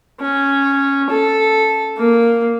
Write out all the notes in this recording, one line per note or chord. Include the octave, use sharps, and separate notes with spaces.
C#4
A4
A#3